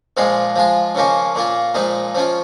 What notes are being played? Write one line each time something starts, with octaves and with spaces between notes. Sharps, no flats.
A#2 F3 G#3 F4
F3 G#3 F4
C#3 F3 A#3 C#4
A#2 A#3 F4
A#2 F3 G#3 D#4
F3 C#4 F4